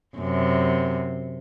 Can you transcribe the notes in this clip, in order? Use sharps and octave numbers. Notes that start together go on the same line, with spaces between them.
F#2 C3